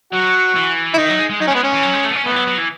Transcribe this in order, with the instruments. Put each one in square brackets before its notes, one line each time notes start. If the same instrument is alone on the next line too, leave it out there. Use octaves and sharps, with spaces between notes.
[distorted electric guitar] F#3 [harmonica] F#4
[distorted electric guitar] E3
[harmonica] E4
[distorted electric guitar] D#3 [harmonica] D#4
[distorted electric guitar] F#3
G#3
G#3
[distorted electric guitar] F#3 [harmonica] D#4
[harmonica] C#4
[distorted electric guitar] G#3 [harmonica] B3
[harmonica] C#4
[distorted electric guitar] E3
F#3
G#3
A3
B3
C#4
[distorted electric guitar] A3 [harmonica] B3
[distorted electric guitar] E3
F#3
F#3
E3